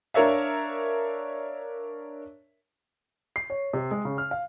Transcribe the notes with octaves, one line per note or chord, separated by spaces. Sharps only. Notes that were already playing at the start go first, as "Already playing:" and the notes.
D4 A#4 C#5 E5 F5
C7
C#5
C3
G#3
C#3
F6
F5